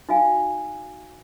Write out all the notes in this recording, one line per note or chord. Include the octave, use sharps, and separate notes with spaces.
D#4 F#4 F5 G#5